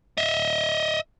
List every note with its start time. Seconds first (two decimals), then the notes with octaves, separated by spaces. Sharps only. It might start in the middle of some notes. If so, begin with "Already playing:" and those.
0.18 D#5 E5